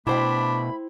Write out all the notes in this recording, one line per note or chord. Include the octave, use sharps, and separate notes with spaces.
B2 A3 D4 E4 C5 G5 B5